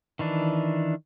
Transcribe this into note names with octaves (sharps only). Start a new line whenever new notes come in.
D#3 E3 D4